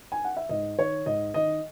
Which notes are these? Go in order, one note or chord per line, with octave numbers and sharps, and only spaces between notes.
G#5
F#5
E5
G#2 D#5
D#3 C#5
G#2 D#5
D#3 D#5